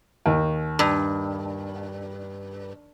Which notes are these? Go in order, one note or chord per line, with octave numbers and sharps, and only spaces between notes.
D#2
G2